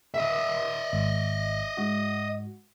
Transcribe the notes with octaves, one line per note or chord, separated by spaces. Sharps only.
D#5 E5
G#1
G#2 F#4